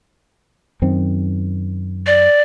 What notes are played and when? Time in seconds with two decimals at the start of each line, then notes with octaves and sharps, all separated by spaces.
0.82 F#2 D#3 C4
2.07 D5